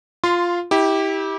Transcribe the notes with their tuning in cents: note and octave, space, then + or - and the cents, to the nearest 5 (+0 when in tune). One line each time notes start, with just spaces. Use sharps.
F4 +0 F5 +0 C6 -15
E4 -35 G4 +0